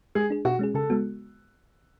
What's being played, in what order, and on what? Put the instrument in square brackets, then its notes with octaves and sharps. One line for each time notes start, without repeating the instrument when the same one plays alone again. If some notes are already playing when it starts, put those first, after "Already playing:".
[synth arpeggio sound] G#3 [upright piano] G#4
[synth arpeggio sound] D4 G#4
[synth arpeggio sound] B2 [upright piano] F#4
[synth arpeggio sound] G#3 C#4 G#4
[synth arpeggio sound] C#3 [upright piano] A4
[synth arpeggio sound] G#3 B3 F#4